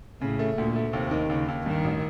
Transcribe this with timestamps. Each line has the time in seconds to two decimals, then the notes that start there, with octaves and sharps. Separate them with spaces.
0.21 A2 C#3
0.39 A3
0.57 D2 A#2
0.76 A3
0.93 D#2 C3
1.11 D#3
1.29 D#2 C#3
1.48 D#2
1.66 G2 D#3
1.84 A1